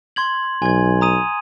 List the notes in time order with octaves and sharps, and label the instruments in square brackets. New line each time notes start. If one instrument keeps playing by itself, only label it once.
[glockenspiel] C6 G#6 F#7
[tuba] B1 [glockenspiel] G#5 G#6
[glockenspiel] A#5 D#6 D#7